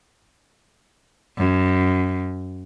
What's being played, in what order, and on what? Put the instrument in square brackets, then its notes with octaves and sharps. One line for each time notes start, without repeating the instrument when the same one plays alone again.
[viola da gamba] F#2